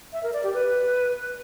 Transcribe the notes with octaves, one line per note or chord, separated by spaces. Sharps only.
E5
A#4
D5
G4
B4